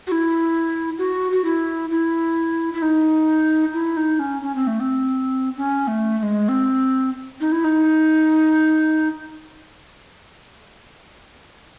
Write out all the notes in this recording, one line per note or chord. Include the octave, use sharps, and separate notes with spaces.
F#4
E4
F#4
F#4
E4
E4
E4
D#4
E4
D#4
C#4
C#4
C4
A3
C4
C#4
A3
A3
G#3
C4
D#4
E4
D#4